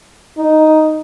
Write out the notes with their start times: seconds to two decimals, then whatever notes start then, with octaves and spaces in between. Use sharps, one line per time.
0.38 D#4